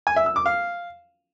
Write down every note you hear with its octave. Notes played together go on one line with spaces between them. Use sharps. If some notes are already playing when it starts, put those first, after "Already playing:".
G#5
E5
E6
D6
F5